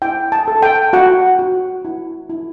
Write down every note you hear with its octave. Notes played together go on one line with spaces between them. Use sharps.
E4 G5
A5
A4
G5
F#4 F#5
F#4
E4
E4